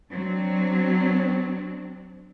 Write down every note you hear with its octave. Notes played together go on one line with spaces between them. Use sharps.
F#3 C4 D4